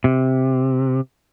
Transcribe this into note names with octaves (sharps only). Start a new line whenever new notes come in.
C3